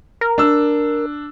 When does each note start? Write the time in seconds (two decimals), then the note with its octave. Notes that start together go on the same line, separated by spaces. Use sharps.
0.21 A#4
0.38 D4 E6